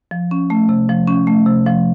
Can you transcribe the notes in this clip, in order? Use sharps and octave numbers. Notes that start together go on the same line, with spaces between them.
F3
C#4
A3
C3
F3
C#4
A3
C3
F3